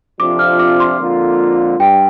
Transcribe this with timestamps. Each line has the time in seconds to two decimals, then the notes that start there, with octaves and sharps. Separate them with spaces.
0.20 F2 C3 F3 D4 F4 D6
0.39 F6
0.59 D6
0.80 C6
0.99 F2 D3 A#3 F4
1.79 G2 G5